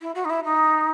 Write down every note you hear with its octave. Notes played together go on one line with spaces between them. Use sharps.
E4
F#4
D#4
E4
D#4